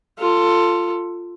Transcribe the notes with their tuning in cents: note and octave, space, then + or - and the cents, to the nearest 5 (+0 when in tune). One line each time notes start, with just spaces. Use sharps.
F4 +0 A4 +20